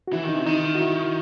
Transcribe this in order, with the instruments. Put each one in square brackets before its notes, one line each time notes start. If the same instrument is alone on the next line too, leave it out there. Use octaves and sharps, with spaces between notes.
[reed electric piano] F#4
[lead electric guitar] E3 [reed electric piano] E4
[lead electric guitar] D#3
[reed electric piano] D#4
[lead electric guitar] C3
[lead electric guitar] D#3 [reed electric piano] D#4
[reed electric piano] F#4
E4